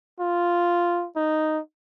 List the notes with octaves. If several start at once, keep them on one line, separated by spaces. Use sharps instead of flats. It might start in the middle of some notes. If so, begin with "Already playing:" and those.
F4
D#4